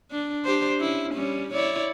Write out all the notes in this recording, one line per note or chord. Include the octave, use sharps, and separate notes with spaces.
D4
D4 G4 C5
C#4 E4
G3 C#4
E4 C#5 D5